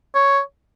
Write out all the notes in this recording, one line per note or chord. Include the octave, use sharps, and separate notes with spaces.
C#5